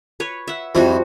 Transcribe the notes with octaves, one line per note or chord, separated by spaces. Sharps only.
B4 C#5
E5 F#5
F2 F3 G3 E4 F#4